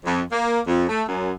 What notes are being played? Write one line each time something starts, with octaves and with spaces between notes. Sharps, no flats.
F2
A#3
F2
A3
F#2